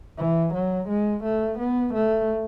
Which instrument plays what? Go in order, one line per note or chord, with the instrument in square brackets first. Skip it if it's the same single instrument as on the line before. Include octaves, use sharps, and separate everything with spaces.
[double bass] E3
F#3
G#3
A3
B3
A3